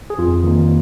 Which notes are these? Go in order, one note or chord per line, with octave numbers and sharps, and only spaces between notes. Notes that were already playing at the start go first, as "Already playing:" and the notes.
G#4
F2 F4
D#3 A#3